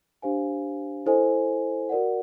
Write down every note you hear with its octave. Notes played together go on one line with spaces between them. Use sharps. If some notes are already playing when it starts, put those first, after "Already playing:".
D4 G4 C5 F5 G#5
E4 A4 C5 D#5 G#5
F#4 A#4 D5 F#5